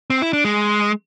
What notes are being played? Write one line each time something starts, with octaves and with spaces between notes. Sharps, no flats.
C4
E4
D4
G#3